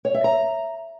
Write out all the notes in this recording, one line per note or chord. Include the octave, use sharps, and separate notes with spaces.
C#5
E5
A#5